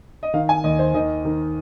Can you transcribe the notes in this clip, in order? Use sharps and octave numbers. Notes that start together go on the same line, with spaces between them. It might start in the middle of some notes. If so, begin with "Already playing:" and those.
D#5
D#3 F5
G#5
D#2 D#5
C5
D#3 D#5
D#3